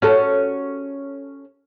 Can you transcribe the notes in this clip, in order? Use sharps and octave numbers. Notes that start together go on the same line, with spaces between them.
C#4 F#4 A4